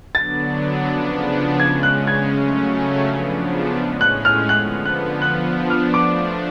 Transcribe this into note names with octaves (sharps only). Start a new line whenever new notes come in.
D3 F#3 B3 D4 A6
C#3 F3 B3 D4
C#3 G#3 C#4 G#6
F#6
G#6
C#3 F#3 A3 C#4
C#3 F3 B3 D4
A2 G#3 C#4
F#6
F6
D3 F3 B3 F#6
F#6
F3 B3 D4 F#6
F6
F3 A3 D4 D6